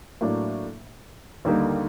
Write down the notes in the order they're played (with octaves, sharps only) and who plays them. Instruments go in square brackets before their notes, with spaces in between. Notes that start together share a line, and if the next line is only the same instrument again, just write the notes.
[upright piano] A2 F#3 A#3 D4
D#2 D3 G3 A#3 D#4